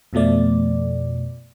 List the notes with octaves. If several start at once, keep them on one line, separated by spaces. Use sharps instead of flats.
F2 B2 F3 A3 D5